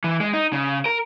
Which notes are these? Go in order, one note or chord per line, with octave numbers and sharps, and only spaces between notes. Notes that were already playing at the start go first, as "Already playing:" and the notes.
E3
G#3
D#4
C#3
A#4